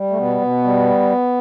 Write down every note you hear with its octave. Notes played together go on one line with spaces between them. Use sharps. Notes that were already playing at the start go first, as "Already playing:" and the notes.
Already playing: G3
A3
B2 B3
B2
G3